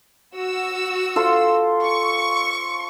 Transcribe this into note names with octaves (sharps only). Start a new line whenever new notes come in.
F#4 E6
F4 A4 C5
C#6